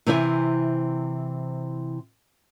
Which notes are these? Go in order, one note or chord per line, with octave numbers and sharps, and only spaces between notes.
C3 E3 C4 E4 D5 G#5